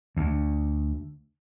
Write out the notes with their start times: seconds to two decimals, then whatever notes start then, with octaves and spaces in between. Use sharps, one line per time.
0.17 D2